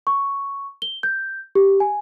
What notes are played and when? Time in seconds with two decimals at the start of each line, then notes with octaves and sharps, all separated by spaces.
0.07 C#6
0.82 G7
1.03 G6
1.55 G4
1.80 G#5